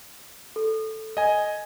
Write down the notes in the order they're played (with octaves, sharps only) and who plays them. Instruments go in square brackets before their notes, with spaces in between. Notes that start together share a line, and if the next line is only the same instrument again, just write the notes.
[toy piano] A4
[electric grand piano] D#5 G#5